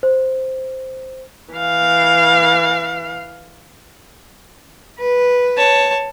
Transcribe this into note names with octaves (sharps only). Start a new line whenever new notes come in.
C5
E3 F5
B4
C#5 A5